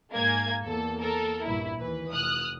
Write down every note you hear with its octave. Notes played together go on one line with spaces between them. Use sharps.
G#2 A#3 G#5 G#6
E2 A#3 A4
A4 A#4
A#1 G2 E4
D#2 E3 B4
F1 D#6 F6 F#6